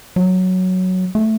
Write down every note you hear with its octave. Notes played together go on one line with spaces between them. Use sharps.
F#3
A3